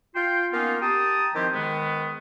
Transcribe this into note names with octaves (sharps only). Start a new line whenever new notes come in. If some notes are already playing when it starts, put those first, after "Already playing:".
F4 G5 C6
A#3 B3 C#4 D#4 F4
G4 G5 A5 A#5 D#6
D#3 F3 C4 E4 G4 C5
G#2 D#3 G#3 B3